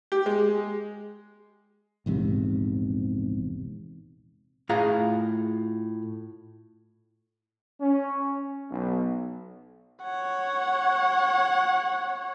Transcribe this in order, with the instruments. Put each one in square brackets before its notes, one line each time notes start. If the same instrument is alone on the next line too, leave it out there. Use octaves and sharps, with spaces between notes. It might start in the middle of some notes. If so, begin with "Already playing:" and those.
[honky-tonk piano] G4
G#3
[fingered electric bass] A#1 E2 G#2 C3
[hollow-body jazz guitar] A2 F4 G#4 F5 A#5
[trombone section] C#4
B1
[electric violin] C#5 F#5